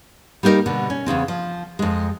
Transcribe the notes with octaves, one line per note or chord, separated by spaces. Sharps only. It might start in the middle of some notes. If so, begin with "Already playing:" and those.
G3 A#3 D#4 F4 A#4
B2 D3
C#4
E2 A2 C#3 C4
F3
F2 G#3